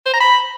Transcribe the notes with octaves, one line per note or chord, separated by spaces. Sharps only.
C5
A#5
B5